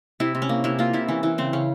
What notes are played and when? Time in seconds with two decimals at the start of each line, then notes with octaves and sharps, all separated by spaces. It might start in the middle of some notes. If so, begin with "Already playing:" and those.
0.20 C3 E4
0.35 C3
0.42 C#4
0.49 A#3
0.64 C3 E4
0.79 A#3 F4
0.93 C3 E4
1.08 E3 C#4
1.23 E3 C#4
1.38 C#3 C4
1.53 C#3 C#4